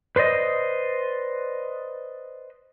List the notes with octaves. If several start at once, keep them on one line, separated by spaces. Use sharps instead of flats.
B4 C5 D5 D#5